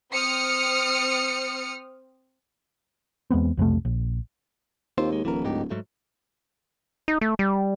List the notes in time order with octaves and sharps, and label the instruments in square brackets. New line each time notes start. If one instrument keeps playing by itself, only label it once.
[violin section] C4 D#6 F6 C#7
[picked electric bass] E2 G#3 B3 C4
B1 F2 C3 A3
A#1
[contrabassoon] D#2 [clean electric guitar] C4 F4 C5
[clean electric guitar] G#3
[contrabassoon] D1 [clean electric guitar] E3 A#4
[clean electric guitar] G#2 D#4 G4
G#2 F#3 A3
[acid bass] D#4
A3
G3